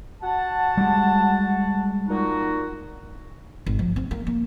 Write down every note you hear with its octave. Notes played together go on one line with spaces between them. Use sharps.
F#4 F#5 A5
G3 G#3
A#2 D#4 F#4
G#1
F3
C4
A#3
A#3